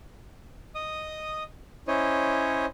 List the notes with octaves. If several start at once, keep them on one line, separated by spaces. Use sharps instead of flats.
D#5 D#6
C#4 E4 C5 C#5 D#5